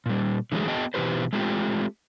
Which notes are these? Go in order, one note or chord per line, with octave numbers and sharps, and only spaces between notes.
A#2 G3
D3 E3 F#3 G#3 A3 G#4
B3 F#4 G#4 D#5 G5 A5
B2 E3 F#3 G4 B4 C5
G#3 A3 C4 F4 G4